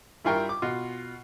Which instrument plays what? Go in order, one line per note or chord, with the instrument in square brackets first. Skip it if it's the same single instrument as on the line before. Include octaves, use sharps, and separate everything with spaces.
[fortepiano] G2 E4 F4 A#4 G5 C#6
D6
B2 F4